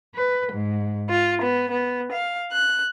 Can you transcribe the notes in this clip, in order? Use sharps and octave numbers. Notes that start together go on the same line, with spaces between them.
B4
G#2
F4
B3
B3
F5
F#6